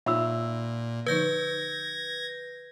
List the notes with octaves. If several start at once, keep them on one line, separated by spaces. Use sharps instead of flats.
A#2 D#4 F4 E5 B5 E6
D3 F3 D#4 B4 G6 G#6 A#6